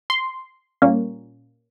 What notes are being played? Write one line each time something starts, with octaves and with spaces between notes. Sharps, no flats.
C6
A#2 G3 A#3 C#4